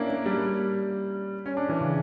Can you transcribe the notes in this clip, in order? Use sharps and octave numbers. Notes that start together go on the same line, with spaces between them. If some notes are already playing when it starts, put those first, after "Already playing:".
Already playing: A#3 C#4 D4 E4
A#3
G3
C#4
D4
E3
C#3